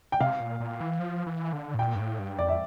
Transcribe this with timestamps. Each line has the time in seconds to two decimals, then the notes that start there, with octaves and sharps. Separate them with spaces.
0.12 G5
0.20 C3 F5
0.40 A#2
0.60 A#2
0.80 E3
0.99 F3
1.27 E3
1.53 D3
1.74 A2
1.79 A#2 G5
1.95 G2
1.99 A2
2.19 G2
2.38 F2 D5
2.49 E5